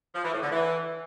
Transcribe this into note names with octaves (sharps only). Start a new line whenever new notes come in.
F3
E3
A2
D3
E3